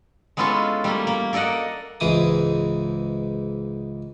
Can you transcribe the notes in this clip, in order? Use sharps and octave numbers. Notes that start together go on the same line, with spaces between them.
G#3 B3 C#4 E4 F4 A4
G3 A3 A#3
A#3
A#3 A4 D5 D#5 F#5
C#2 G#2 E3 G#4 D6 D#6